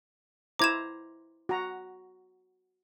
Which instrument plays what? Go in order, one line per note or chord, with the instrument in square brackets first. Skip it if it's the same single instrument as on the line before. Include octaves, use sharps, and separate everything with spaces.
[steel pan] E4 C5 A#5 [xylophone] D6 G#6 E7
[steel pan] F#4 A#5